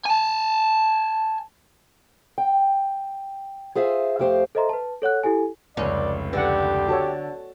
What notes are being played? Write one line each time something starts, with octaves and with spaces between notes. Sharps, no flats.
G#5 A5
G5
F4 G#4 C5 E5 F5
F2 A3 G4 C5 F5
A4 C5 D#5 E5 A#5 C6
B4 A5
A4 C#5 F#5 F#6
E4 G4 A4 G#5
F1 C#2 C#4 D5
D3 G4 B4 F#5
F#4 A4 C#5 A5